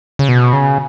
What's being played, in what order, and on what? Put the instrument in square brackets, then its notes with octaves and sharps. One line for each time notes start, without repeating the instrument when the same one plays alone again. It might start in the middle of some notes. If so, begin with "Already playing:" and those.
[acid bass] C#3
B2
C#3